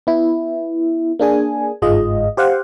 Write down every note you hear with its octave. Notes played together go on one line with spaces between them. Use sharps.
B3 E4
A#3 D4 G#4 G#5
G1 G#2 G#3 F4 D#5
G4 C5 F5 F#5